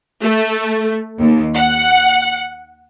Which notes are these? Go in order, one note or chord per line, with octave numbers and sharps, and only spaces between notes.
A3
D#2
F#5